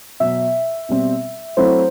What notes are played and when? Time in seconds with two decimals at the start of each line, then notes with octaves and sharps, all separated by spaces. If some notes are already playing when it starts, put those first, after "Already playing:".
0.20 B2 F#3 B3 E5
0.89 B2 G3 C4
1.57 F#3 A3 C4 E4 C5